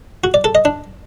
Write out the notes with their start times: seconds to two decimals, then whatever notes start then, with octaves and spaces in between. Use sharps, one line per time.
0.24 F#4
0.34 D5
0.44 A4
0.55 D#5
0.65 D4